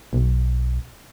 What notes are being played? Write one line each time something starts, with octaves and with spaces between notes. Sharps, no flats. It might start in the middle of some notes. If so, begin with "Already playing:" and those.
B1